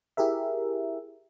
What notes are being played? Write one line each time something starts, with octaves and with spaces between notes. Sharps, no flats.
E4 G4 G#4 A#4 E5